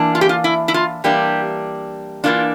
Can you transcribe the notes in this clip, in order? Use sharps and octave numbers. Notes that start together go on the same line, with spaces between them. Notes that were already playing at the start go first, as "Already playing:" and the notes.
Already playing: E3 A#3 D4
F4
G4
F4
E4
E4
F4
E3 G3 A#3 D4 G4
E3 A#3 D4 F4